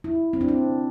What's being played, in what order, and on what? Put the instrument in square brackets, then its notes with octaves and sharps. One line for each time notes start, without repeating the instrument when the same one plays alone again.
[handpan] E4
C4
D4
C4